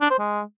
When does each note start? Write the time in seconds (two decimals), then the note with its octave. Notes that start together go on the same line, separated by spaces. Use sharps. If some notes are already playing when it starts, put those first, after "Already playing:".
0.01 D4
0.10 C5
0.19 G#3